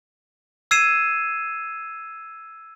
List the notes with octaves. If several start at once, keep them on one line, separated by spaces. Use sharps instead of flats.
E6 G#6 C7 D#7 E7